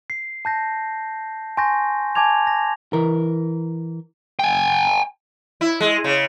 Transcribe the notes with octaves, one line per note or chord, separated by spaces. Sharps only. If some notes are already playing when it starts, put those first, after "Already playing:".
C7
A5 G6 A#6
G#5 C6 C#6 G6 A#6
G#5 A5 D6 G#6 F7
A#6
E3 A#4
G5 G#5
E4
G#3
C#3